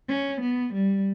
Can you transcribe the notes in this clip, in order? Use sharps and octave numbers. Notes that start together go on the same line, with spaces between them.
C#4
B3
G3